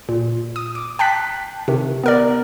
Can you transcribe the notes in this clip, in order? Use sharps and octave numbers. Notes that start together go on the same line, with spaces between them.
A#2
D#6
D6
G5 A5 F#6 B6
C3 D#3
B3 A#4 D5